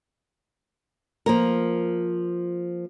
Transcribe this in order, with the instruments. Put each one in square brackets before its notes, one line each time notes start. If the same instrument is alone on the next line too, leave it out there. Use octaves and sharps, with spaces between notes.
[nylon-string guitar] F3 A#3 A#4